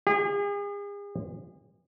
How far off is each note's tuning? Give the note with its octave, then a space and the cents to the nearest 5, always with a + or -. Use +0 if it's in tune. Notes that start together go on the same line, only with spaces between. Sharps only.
G#4 -40